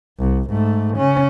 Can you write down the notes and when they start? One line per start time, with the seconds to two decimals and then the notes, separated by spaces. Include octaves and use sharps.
0.19 C2
0.51 G#2 A3
0.97 C#3 C#4